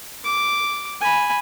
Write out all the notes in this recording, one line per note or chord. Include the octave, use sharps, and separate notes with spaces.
D6
G#5 B5